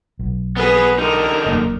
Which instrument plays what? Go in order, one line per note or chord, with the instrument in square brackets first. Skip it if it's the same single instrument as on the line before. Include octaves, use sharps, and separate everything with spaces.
[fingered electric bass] B1
[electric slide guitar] B3 G#4 [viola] B4
[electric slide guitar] D3 D#4 [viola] A#4
[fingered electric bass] E1 F#2 A#3